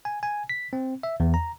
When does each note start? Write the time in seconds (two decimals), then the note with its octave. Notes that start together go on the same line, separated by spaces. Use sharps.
0.05 G#5
0.23 G#5
0.49 B6
0.73 C4
1.03 E5
1.20 E2
1.34 A#5